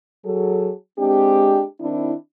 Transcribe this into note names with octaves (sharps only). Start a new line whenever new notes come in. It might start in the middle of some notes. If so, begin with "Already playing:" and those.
F#3 G#4 A4
G#3 C4 D4 G4
D#3 C4 D4 E4